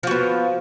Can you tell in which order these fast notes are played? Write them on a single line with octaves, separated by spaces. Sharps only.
F3 F#4 B3